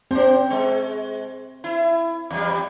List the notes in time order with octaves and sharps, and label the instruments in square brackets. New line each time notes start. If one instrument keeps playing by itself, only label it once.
[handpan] C4 [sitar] C#4 C5
[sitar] G#3
E4
E2 G3